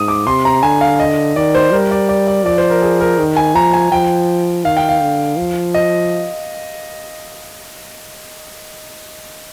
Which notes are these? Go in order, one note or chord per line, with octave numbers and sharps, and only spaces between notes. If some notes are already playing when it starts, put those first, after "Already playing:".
Already playing: G#2 D#6
D6
C3 C6
A#5
D3 G#5
F5
D#5
D#3 D5
C5
G3 A#4
D5
D5
D5
F3 D5
C5
A#4
G#4
A#4
D#3
G#5
F3 A#5
G#5
F3 G5
D#3 F5
G5
F5
D3
F3
D#5